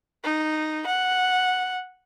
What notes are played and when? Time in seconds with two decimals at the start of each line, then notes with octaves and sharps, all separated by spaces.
0.24 D#4
0.87 F#5